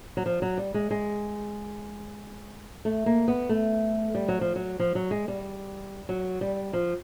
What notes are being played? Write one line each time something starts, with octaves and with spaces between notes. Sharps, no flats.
F#3
F3
F#3
G3
G#3
G#3
A3
A#3
B3
A3
G3
F#3
F3
F#3
F3
F#3
G#3
G3
F#3
G3
F3